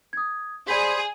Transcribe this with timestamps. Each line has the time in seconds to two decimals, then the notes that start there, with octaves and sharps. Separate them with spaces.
0.13 D#6 G#6
0.68 G#4 C5 D5 B5 B6